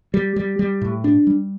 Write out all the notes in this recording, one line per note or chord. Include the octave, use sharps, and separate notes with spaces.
G3
G3
G3
A2
D4
G3